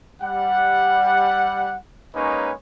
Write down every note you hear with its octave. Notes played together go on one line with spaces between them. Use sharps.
G3 F#5
G#3 A#3 C#4 D#4 B4 C#5